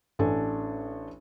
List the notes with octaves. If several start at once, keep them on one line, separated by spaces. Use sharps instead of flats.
A1 D4 A4 G#5